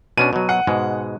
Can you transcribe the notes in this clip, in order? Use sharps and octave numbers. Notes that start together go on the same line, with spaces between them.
B2 C#4 D4 D#7
B2 F#3
F#5
G#2 B2 G#3